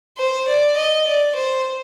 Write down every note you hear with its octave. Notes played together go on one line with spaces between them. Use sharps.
C5
D5
D#5
D5
C5